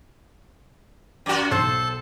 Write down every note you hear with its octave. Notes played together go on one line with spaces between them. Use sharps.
F#2 F#4
B1 A4 C5 A5